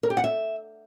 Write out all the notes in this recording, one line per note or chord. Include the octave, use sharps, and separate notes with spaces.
A#4
G4
F#5
E5